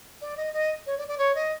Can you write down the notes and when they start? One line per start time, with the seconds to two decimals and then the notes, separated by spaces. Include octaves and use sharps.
0.21 D5
0.36 D#5
0.53 D#5
0.86 C#5
0.97 D5
1.07 D5
1.17 C#5
1.34 D#5